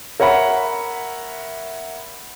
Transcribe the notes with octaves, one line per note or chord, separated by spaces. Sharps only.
A#4 C#5 E5 F#5 B5